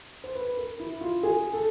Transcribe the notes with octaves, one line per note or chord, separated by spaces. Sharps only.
C5
B4
A#4
E4
F4
G#4
A4